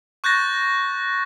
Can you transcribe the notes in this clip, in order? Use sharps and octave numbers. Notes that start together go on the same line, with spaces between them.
C#6 F#6 G6 A6 A#6